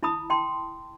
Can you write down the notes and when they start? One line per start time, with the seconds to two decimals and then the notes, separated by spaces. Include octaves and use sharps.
0.03 E4 A5 B5 D#6
0.30 G5 A5 C6